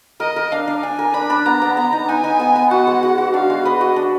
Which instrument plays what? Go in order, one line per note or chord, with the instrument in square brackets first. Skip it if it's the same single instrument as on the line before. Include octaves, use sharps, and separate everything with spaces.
[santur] A#4 [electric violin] D#5
[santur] A#4
[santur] D4 [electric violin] F5
[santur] D4
[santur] D4 [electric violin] G#5
[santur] A#4
[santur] D4 [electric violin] B5
[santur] D4
[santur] B3 [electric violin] A#5
[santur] B3
[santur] B3 [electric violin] A#5
[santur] D#4
[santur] D#4 [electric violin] G#5
[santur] D#4
B3
B3
[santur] F#4 [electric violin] F#5
[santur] G#3
F#4
F#4
[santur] D4 [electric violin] F5
[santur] G#3
[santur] B4 [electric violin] D#5
[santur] F#4
D4